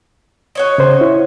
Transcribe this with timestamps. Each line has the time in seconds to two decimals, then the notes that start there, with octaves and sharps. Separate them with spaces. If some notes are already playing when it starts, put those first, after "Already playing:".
0.55 F#4 C#5 D#5
0.78 C#3 C5
1.01 E4